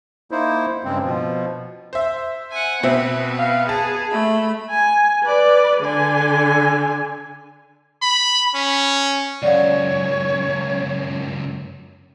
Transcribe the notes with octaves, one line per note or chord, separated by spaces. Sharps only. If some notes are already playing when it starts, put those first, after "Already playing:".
A#3 D#4 E4 C5
G2 C#3 G#3 C4
B2 F3
C5 E5
F#5 G#5
B2 B3 C4 B4 E5
F5
G#4 A5
A3 B5
G#5
B4 D5
D3 G#5
B5
C#4
C#2 F#2 C#5 D5 F5 F#5